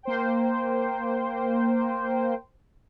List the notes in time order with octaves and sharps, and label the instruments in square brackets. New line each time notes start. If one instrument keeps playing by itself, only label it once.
[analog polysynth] A#3 C5 G5